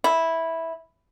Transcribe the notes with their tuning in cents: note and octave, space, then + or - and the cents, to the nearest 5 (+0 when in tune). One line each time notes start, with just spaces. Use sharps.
E4 -10